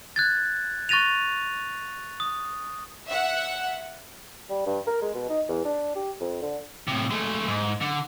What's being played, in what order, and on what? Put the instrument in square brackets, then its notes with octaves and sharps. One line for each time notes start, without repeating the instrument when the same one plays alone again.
[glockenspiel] F#6 G#6 A6
C#6 F#6 A6 A#6 D#7 F7
D#6
[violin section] E5 F#5
[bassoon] G3
G2
A#4
G#3
B2
D#4
E2
D4
G4
F2
D3
[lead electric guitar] A2 C3
G#3 A3
G#2
D3